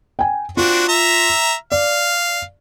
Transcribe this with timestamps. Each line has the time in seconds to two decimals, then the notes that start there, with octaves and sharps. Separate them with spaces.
0.19 G5 G#5
0.57 C4 D4 F4 F#4
0.88 E5 A#5
1.72 D5 F5